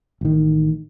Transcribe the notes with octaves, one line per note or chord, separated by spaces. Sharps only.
A1 D#3